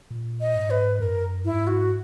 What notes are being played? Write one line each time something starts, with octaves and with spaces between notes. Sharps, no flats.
A#2
D#5
G#2
B4
F#2 A#4
G#2 E4
F#4